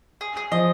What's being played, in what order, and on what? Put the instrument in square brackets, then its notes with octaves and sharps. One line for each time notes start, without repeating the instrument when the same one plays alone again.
[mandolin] G#4
G#4
[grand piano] F3 [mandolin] D#5